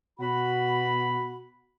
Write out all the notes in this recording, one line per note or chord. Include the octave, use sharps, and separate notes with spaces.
B2 F#4 B5